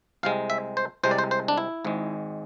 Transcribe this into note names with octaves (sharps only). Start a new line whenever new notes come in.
C2 C3 G#3 F5
E5
C5
C2 C3 G#3 C5
D5
C5
C5
D4
E4
G#1 G#2 G#3